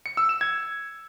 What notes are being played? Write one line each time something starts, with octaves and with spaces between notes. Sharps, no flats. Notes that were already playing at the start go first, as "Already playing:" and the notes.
C#7
E6
E7
G#6